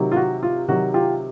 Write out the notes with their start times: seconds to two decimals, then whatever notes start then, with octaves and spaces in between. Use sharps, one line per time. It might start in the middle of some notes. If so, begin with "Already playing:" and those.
Already playing: C3 D#3 F#3
0.12 F4
0.16 F#4
0.43 F4
0.68 C3 D#3 F#3 F#4
0.94 F4 G4